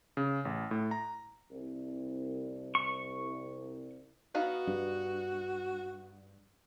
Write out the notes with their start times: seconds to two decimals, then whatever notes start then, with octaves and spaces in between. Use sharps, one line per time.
0.17 C#3
0.45 A1
0.71 A2
0.91 A#5
1.51 C2
2.75 C#6
4.35 B3 D#4 F#4 F5
4.67 G2